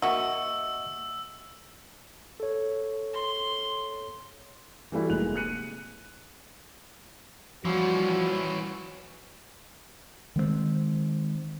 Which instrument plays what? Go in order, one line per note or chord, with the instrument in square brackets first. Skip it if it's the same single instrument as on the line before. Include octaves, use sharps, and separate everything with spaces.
[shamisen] A#3 F#4 [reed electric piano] D#5 E5 C#6 [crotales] E6
[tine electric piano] A4 C#5
[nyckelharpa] C6
[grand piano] E3 G3 A3 E4 F#4
F1 G#3 A#3 F#6 F7
F#6 C#7 D#7
[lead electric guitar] E3 C#4 [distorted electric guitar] F3 [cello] G3 [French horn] F#4
[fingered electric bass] D#3 G#3 A3 C4